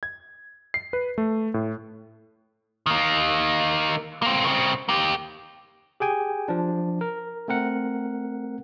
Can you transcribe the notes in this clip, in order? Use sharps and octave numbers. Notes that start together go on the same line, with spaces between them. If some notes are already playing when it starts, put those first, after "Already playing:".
G#6
C7
B4
A3
A2
D#3 A#3
A#3 C4
C#3 C4
A#3 G4
G4 G#4 G5 G#5
F3 D4
A#4
A3 C4 A#4 F#5